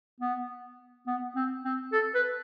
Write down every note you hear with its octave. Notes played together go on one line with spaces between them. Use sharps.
B3
B3
C4
C4
A4
B4